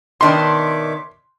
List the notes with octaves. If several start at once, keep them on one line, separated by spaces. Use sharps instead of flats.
B2 D#3 D4 C#5 E5 C6 D6